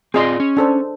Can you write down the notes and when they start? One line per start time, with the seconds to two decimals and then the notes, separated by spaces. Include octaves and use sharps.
0.14 C4 F4 G#4 D5 D#5 C6
0.40 C#4
0.57 D4 A4 C5